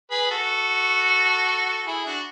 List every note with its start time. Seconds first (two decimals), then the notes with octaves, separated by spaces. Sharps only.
0.11 G#4 B4
0.31 F#4 A4
1.86 E4 G#4
2.06 D4 F#4